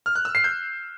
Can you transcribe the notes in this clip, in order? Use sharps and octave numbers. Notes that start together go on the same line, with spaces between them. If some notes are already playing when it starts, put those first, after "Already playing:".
F6
F#6
E6
C7
G6